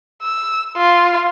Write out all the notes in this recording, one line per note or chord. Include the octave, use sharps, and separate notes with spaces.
E6
F4